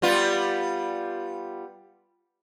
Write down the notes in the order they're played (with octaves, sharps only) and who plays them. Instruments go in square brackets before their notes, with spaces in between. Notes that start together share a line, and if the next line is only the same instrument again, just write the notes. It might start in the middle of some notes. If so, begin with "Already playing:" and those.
[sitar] G3 B3 F4